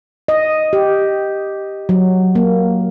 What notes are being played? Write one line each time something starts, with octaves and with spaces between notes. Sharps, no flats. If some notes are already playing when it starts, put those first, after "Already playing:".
D#5
G4
F#3
A#3